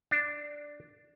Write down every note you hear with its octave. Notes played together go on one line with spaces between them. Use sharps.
D4